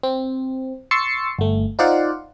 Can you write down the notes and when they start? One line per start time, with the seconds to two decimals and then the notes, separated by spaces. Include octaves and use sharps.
0.03 C4
0.91 C6 C#6 E6 A6 C7 C#7
1.39 G1 A3
1.79 D#4 F4 C5 D5 F5 F#5